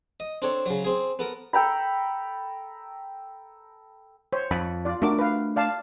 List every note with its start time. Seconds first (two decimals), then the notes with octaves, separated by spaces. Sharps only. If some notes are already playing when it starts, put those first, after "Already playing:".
0.20 D#5
0.42 C4 D4 A4 C#5
0.66 C#3 F#3
0.85 C4 G#4
1.19 B3 A4 A#4
1.53 A4 G5 A#5 B5
4.33 C5 C#5
4.51 F2 B5
4.85 F4 D5
5.02 A3 D4 F#4 A#4 D6
5.19 B4 F5
5.56 D5 F5 A5